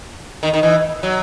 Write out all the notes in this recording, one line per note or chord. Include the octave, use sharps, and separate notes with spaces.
D#3
D#3
E3
F#3